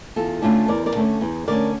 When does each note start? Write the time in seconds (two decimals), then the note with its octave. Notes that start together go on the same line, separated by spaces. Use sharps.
0.16 E2 F4 A4
0.42 D3 A3 C#4 D4 F4
0.68 E2 A#4 D5
0.86 A#4 D5
0.95 D3 A3 C#4
1.21 E2
1.48 D3 A3 C#4 A#4 D5